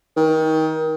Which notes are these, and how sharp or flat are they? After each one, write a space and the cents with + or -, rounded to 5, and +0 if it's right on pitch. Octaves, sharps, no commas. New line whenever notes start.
D#3 +25